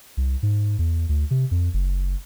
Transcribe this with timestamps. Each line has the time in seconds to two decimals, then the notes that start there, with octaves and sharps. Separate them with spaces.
0.17 C2
0.43 G#2
0.79 E2
1.09 D2
1.31 C3
1.51 F2
1.74 F#1